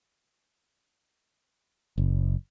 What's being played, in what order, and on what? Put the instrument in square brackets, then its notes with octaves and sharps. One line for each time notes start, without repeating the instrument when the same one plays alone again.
[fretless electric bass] F#1